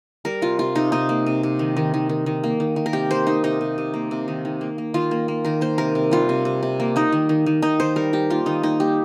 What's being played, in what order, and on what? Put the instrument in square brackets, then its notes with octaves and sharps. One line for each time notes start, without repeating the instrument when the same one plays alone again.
[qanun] G3 A#4
C3 F4
C3 F4
C3 D#4
C3 D#4
A#3
C3
C3
D#3
D#3
D#3
D#3
D#3
A#3
D#3
D#3
A#4
C3 G4
A#3 C5
A#3 D#4
C3 D#4
C3
C3
A#3
C3
D#3
D#3
A#3
A#3
D#3 F4
A#3
A#3
D#3 A#4
A#3 C5
C3 A#4
C3
G3 F4
C3
C3
C3
A#3
A#3 D#4
D#3
D#3
D#3
D#3 D#4
D#3 C5
G3 A#4
G3 G4
A#3 F4
D#3 D#4
A#3 D#4
A#3 G4